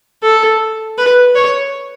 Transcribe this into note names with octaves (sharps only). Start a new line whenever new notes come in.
A4
B4
C#5